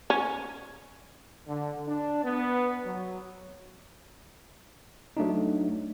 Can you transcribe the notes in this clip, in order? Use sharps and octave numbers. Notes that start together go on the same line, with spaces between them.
C#4
D3
D4
B3
F#3
F#3 A3 D4 D#4